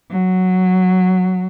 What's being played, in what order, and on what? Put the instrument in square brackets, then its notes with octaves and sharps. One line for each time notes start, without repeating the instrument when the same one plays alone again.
[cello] F#3